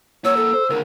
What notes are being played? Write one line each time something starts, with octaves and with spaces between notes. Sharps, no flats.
A#3 F#4 C#5 E6
A4
C5
C#2 D3 A#4